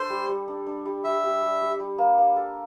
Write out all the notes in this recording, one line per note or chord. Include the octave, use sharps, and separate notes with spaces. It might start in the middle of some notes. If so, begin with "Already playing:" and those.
Already playing: D4 A4 C5
G3
G3
D4
D4
G3
G3 E5
G4
G3
G3
G3
A#3
A#3
A4